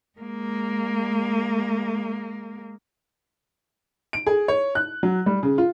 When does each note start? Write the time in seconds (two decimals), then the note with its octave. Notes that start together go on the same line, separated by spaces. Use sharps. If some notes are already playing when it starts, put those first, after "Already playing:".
0.19 G#3 A#3
4.13 D7
4.26 G#4
4.48 C#5
4.75 F#6
5.03 F#3
5.26 G3
5.43 C#3
5.58 F4